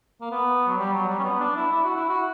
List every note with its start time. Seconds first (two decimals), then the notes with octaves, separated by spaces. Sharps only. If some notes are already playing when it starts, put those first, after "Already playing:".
0.21 A#3
0.31 B3
0.67 F#3
0.78 G3
0.93 F#3
1.09 G3
1.19 C#4
1.24 B3
1.40 D4
1.56 E4
1.72 E4
1.84 F#4
1.96 E4
2.09 F#4